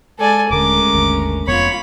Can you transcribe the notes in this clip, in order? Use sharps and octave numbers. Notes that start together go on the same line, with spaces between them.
G#3 A4 D5 G#5
D#1 D3 G#3 A3 C#4 A#4 D6
G#1 D#2 D3
F1 F2 B3 F4 C#5 B5